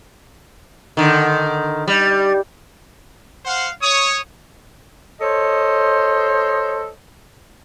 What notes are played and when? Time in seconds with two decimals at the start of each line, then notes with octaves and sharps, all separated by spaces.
0.97 D3 D#3
1.88 G3
3.45 C5 F5 F#5
3.81 C#5 D#6
5.20 A4 C5 C#5 D#5